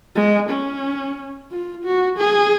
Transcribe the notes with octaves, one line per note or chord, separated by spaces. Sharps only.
G#3
C#4
F4
F#4
G#4